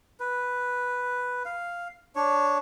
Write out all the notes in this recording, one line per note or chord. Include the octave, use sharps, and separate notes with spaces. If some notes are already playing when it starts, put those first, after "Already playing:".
B4
F5
D4 C#5